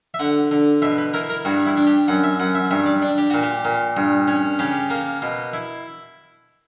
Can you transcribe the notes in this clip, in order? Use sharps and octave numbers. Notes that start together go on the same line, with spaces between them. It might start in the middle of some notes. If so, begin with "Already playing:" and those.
E5
D3 F#5
D3
B2 E5
B4
E4 A#4
A#4
G2 F#4
E4
D4
G4
F#2 F#5
E5
F#2 F#5
E5
G2 E5
D5
D4 D5
G4
A#2 F#4
G4
A#2
G2
C#4
C#3 G4
A#3
B2
E4